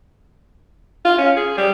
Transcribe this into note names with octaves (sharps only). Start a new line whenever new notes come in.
F4
C#4
G#4
G3